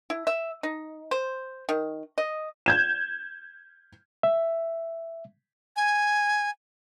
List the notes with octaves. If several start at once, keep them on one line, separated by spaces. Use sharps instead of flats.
E4
E5
D#4
C5
D#3
D#5
G6 G#6 E7
E5
G#5